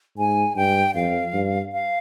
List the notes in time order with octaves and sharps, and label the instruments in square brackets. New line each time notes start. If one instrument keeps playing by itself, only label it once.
[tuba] G#2 [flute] G#5
[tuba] G2 [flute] G5
[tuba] F2 [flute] F5
[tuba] G2
[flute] F5